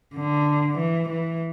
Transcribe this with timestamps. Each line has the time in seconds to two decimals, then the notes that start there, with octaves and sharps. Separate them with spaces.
0.14 D3
0.78 E3
1.09 E3